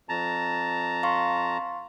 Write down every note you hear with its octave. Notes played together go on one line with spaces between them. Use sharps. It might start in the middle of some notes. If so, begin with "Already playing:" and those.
F2 A5 A#5
F5 C6 C#6